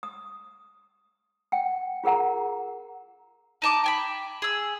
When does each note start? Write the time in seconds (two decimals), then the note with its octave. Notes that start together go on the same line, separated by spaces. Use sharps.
0.03 D#6
1.52 F#5 G5
2.04 F4 G#4 A#4 F#5 A#5
3.62 D#4 A5 D6
3.84 G5 G#5 B5
4.42 G#4 E6